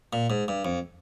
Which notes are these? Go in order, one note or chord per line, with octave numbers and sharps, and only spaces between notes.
A#2
G#2
G2
F2